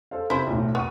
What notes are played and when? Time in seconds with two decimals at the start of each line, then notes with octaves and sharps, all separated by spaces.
0.11 A4 C5 F5
0.30 C3 E4 C5
0.47 B1 A2
0.75 B3 C#6 D#7